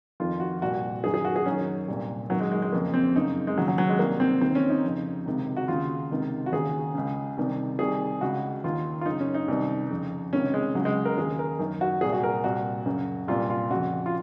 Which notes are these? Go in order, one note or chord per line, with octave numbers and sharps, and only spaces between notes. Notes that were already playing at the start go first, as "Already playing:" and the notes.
F2 D#3 F4
F#4
C2 A#2 F#4
F#2 D#3 G#4
G#4
F#4
G#4
F#2 D#3 C#4
C2 A#2
F#2 D#3 F#3
G#3
G#3
G#3
F2 C#3 A#3
C4
F#2 C#3 D#4
G#3
D#2 C#3 F#3
F#3
F#3
G#3
C2 C3 D#3 A#3
C4
D#2 D#3 C4
C#4
D#4
F2 C#3
C#2 C3 D#3
F#4
D#2 C#3 F4
C#2 C3 D#3
F#4
D#2 C#3 G#4
C#2 C#3
C2 C3 D#3
C2 C3 D#3 G#4
C#2 C#3 F#4
D#2 D#3 F4
F4
F#2 C#3 D#4
C#4
D#4
C2 C3 D#3
F2 C#3
C#2 C3 D#3 C#4
G#3
C#2 C#3 F#3
G#3
A#4
D#2 C#3 G#4
A#4
F#2 D#3
F#4
C2 A#2 G#4
F#4
A#4
C2 A#2 F#4
F#2 C#3
C2 A#2 F4
F4
F2 C#3 F#4
F4